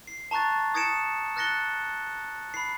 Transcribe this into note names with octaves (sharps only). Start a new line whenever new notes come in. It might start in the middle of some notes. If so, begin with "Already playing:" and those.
C7
A5 A#5 C#6 F#6 A6
D#6 G#6 A#6 C#7 D7 E7
F6 F#6 A6 A#6 C#7 G7
B5 C7